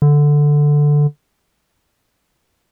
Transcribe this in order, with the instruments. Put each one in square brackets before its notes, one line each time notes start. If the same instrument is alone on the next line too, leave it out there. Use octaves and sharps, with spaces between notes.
[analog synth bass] D3